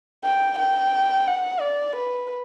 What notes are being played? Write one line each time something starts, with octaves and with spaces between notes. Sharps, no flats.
G5
G5
F#5
D5
B4